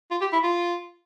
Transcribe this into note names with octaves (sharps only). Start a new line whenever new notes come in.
F4
G4
E4
F4